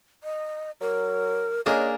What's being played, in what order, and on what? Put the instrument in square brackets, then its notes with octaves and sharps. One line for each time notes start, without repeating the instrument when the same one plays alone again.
[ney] D#5
[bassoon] F#3 [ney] A#4
[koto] A#3 D4 G#4 [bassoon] C#4 [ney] D#5